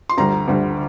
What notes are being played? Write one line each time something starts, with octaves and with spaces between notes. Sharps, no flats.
C6
D2 D3 G3 A#5
D2 D3 G3